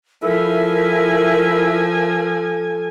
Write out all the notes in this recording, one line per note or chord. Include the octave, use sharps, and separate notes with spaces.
F3 E4 A4 A#4 E5 G#5